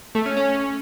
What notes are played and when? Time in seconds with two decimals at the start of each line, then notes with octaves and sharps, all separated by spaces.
0.15 A3
0.26 C#4
0.37 C#4